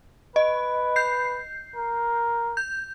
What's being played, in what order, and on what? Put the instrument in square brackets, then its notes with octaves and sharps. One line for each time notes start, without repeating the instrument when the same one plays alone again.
[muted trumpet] B4 [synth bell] D#5
[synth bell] G6 C7
[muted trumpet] A#4
[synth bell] G6